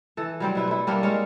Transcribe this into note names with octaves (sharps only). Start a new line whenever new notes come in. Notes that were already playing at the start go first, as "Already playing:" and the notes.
E3 A4
F#3 G3 C4
B2 E4 B4
A3 E4
G3 A#3 D4 C#5
G#3 A#3 C#5 F5